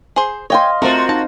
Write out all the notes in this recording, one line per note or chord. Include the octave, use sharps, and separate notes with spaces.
G#4 C5
C#5 D#5 F5 G5 G#5 C6
A3 C4 F4 F#4 A#4 C5 D#6
D#4 A5